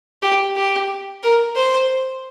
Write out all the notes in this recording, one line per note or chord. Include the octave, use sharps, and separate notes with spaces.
G4
G4
A#4
C5